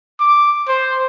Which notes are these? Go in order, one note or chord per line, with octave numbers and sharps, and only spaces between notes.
D6
C5